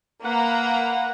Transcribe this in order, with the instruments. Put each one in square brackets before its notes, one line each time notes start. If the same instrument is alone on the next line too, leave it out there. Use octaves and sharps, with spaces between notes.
[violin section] A#3 A#5 [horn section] B4 F#5